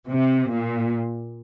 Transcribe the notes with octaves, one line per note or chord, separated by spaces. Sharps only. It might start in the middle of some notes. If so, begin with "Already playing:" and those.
C3
A#2